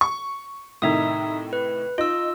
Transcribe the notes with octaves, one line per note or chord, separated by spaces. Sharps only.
C#6
A2 C3 D#3 D#4 E5 D#6
B4
D#4 F4 E6